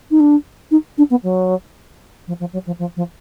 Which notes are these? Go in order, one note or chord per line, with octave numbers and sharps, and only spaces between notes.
D#4
D4
D#4
D4
B3
F#3
F3
F3
F#3
F3
F3
F3